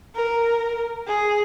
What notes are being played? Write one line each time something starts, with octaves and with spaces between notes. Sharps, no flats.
A#4
G#4